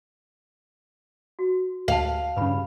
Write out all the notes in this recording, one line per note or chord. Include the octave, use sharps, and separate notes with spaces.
F#4
D2 F5 G5 A5
G2 C#3 B4 B5